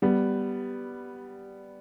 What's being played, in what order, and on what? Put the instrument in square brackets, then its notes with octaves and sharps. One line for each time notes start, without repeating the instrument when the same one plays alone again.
[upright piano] G3 B3